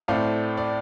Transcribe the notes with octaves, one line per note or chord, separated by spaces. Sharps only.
A2 A3 C4 D5 F5
D5